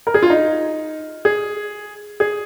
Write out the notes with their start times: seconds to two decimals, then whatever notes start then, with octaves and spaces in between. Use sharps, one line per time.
0.07 A#4
0.14 G#4
0.23 F4
0.30 D#4
1.25 G#4
2.20 G#4